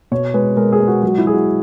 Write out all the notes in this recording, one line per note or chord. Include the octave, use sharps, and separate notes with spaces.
B2 C#5
G#3 B4
G#3 A#4
G#4
G#3
F#4
F#3 F#4
E4
F#3 G#4
F#4